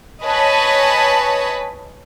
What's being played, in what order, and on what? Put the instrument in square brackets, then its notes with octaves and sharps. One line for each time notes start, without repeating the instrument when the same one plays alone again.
[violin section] B4 C#5 D#5 G#5 A5 B5